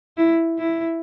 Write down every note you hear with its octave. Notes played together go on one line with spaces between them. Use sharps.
E4
E4